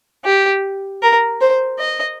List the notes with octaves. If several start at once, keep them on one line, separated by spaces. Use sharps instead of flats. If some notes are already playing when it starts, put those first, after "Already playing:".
G4
A#4
C5
D#5